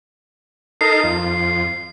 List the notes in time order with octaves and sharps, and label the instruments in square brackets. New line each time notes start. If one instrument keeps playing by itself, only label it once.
[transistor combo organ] D#4 A4 A#4 [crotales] C7
[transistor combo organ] F2